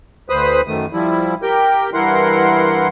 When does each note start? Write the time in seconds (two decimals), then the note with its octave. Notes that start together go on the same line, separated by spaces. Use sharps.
0.30 D2 B4 C5 B5 D#6
0.68 F#2 D#3 A3 D#6
0.93 F3 G3 E4
1.43 G4 A#4 G5 G6
1.94 G2 E3 E4 A#4 F#5 C6